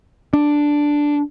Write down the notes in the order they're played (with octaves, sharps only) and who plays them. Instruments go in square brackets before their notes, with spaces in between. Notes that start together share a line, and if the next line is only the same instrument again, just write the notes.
[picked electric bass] D4